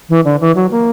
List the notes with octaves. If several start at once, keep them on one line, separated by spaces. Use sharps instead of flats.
E3
D3
E3
F#3
A#3